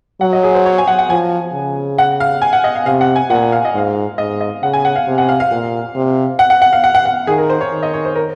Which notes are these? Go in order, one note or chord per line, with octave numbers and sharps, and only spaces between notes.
F#3 F#5
D#5
G#4
C5
C#5
G#5
F#5
F#5
F3 G#5
C#3
F#5
F5
G#5
F#5
D#5
F5
C3 F5
F#5
G#5
A#2 F#5
F5
D#5
G#2 F5
G#2 D#5
D#5
C#3 F#5
G#5
F#5
F5
C3
F#5
F5
F5
A#2
C3
F#5
F#5
F#5
F5
F#5
F#5
F#5
D#3 G#4
A#4
C5
C#5
D#3
D#5
C#5
C5
A#4